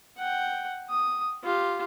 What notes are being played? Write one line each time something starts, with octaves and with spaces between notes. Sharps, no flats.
F#5 G5
D#6
F4 G4